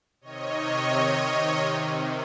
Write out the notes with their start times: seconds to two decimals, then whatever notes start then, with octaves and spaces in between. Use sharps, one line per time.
0.21 C3 D#3 C#5 D#5